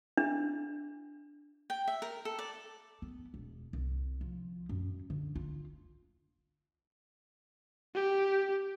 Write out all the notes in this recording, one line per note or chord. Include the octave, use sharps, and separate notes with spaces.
D4
G5
E5
A#4
A4
D5
B3
E1
C2
F3
F#2
D3
F4
G4